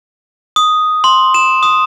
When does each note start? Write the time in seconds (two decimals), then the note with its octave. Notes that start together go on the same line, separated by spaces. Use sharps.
0.56 D#6
1.04 C6
1.34 E7
1.63 D#6